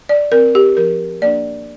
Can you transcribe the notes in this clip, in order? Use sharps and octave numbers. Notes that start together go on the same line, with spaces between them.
D5
C4 A#4
G4
F3 A#4
A#3 D4 D5